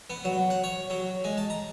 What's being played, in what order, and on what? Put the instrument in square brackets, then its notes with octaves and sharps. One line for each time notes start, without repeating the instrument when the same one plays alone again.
[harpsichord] B3
F#3
F#5
C#5
F#3
G#3
A5
A#5